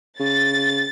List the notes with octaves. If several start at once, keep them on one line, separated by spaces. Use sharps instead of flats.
C#3 A6